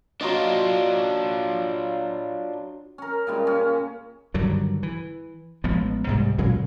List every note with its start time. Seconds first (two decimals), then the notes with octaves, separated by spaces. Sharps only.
0.21 F#3 D4 F4 D#5
2.98 C#4 A#4
3.27 A#2 C#3 G3 G#3
3.47 C#4 G#4
4.34 G2 D3 D#3 F#3
4.83 E3
5.64 A1 F3 G#3 B3
6.07 C2 G#2 G3
6.38 A#2 C#3 F#3 G#3